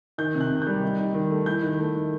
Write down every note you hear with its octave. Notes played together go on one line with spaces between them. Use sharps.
D#3 G6
C3
F#6
C3
G6
G3
D#4
D#4
D#3
A3
E4 G6
D#3
A3
D#3